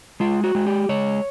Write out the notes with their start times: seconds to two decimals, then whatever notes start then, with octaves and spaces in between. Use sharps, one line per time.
0.20 G#3 F4
0.44 F#4
0.55 G#3
0.66 G4
0.89 G#3 C#5